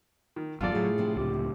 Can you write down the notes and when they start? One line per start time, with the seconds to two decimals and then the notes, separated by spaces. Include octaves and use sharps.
0.36 D#3
0.61 G1 E2 F#3 F4 A4 D5
0.72 A2 C#3 F#3 G#4
0.98 C3 F3 D4
1.16 C#2 A2 G4